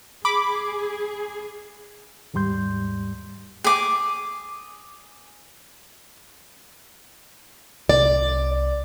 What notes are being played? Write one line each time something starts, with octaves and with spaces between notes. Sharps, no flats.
G#4 B5 D6
D#2 G#2 G3 C6 G6
G#4 D6
C2 D5